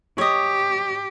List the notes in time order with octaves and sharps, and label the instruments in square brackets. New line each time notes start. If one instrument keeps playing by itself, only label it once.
[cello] G4 [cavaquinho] C#5 D#5